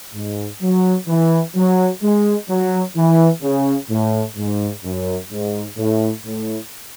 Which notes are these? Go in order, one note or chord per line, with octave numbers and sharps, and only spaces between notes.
G#2
F#3
E3
F#3
G#3
F#3
E3
C#3
A2
G#2
F#2
G#2
A2
A2